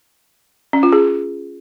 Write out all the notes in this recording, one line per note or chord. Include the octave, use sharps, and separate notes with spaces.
C#4
F4
G#4